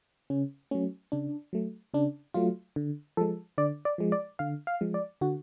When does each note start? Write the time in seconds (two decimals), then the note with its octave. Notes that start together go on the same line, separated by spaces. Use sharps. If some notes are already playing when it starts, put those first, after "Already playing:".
0.30 C#3 C#4
0.71 F#3 A3 C#4
1.12 C#3 D4
1.53 F#3 A3
1.94 C#3 D4
2.34 F#3 A3 F4
2.76 D3
3.17 F3 G#3 A4
3.58 D3 D5
3.85 D5
3.98 F3 G#3
4.12 D5
4.39 D3 F5
4.67 F5
4.81 F3 G#3
4.94 D5
5.21 D3 F#4